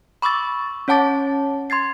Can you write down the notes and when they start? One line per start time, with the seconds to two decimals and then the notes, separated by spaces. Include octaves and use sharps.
0.22 B5 C#6 D6 E6 A6
0.88 C#4 C#5 F#5 A5 D6 A6
1.70 C6 G#6 A6 C7